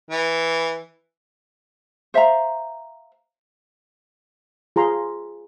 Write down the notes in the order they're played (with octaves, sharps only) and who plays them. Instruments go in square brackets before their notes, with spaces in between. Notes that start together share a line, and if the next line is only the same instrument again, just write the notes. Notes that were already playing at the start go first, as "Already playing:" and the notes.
[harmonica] E3
[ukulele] C5 E5 F5 A#5
[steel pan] F4 G#4 A#5 C6